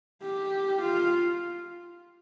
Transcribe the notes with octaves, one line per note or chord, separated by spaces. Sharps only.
G4
F4